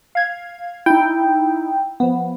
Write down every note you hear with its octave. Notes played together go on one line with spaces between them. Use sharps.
F5 G#6
D#4 E4 G5
F3 B3